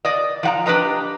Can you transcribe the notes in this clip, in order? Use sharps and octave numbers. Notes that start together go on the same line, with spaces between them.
D5 D#5
F3 F#5 A#5
D4 G4 B4 D#5 A#5